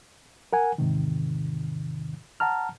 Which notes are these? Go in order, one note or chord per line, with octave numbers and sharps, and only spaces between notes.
A#4 F#5 G#5
E2 G#2 C3 D#3
F#5 A5 A#5 F6